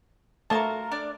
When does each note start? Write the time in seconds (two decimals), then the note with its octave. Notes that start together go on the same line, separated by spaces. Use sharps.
0.50 A3 F4 F#4 A#4 A5
0.91 D4 D5 F6